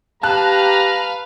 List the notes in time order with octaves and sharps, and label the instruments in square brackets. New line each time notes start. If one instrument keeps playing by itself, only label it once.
[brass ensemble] G4 A#5 [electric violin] B4 F5 [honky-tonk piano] A5 F#6